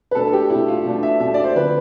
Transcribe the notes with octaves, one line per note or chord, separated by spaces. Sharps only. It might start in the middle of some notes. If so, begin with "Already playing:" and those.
B4
B2 A3 D4 A4
G4
B2 A3 D4 E4
F4
B2 A3 D4
E5
B2 A3 D4 E5
D5
C5
D3 F3 C4 B4